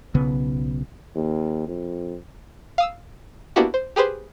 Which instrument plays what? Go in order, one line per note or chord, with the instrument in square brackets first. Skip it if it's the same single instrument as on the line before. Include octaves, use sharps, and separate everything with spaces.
[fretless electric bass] B1 C#3 B3
[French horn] D#2
F2
[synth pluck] F5 D#6 E6
A#3 B3 D4 E4 F#4 G4
C5
G4 G#4 B4 C5